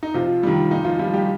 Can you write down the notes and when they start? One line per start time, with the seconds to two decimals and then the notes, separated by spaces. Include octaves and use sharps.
0.03 D#4
0.14 C3 F3 F4
0.43 D#3 G3
0.71 A#2 D#4
0.85 F3 F4
0.99 F3 G3 F4
1.13 G3 G4